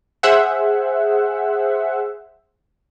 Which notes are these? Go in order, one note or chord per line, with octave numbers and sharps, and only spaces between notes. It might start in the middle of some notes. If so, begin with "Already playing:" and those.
G#4 C5 E5 F#5